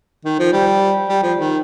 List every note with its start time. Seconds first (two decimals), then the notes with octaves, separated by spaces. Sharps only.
0.25 D#3
0.39 F3
0.53 G3
1.09 G3
1.23 F3
1.38 D#3